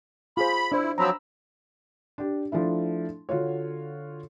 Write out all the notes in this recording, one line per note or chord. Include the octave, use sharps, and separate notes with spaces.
F4 G#4 C5 B5
D4 E4 C5
F3 F#3 C4 A#5 B5 E6
D4 G4
F3 A3 D4 E4
D3 F4 F#4 C#5